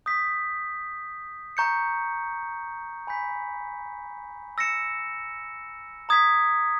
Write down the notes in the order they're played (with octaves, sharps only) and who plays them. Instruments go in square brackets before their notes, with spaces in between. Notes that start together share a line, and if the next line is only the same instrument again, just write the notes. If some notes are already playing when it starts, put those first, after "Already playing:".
[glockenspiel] D#6 G6 B6
A#5 C#6 G6 C#7
G#5 B5 G6 B6
E6 A#6 C#7 E7
A#5 D#6 G#6 B6